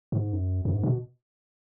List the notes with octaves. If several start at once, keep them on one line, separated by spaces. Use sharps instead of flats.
G#2
F#2
F#2
G#2
B2